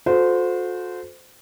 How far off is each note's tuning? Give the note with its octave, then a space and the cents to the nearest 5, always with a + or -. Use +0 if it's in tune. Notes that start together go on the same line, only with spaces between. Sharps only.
F#4 -45 A4 -15 C5 -20